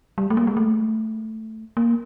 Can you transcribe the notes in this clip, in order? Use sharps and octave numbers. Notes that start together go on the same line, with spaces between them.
G3
A3
A#3
G#3
A3
A#3